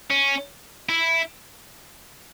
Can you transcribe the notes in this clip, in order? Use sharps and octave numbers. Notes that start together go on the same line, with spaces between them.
C#4
E4